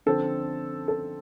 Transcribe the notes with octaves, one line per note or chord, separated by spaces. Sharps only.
D3 F3 C4 A4
A4